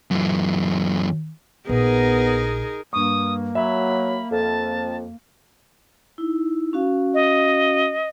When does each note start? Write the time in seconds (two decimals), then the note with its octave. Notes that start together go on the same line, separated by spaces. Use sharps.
0.11 F#2 E3
1.69 A#1 B3 D#4 G#4 A#4
2.93 G2 A#3 C#6 D#6
3.55 F#3 E5 B5
4.31 F2 A5
6.18 D#4 E4
6.73 C#4 F#4 F5
7.14 D#5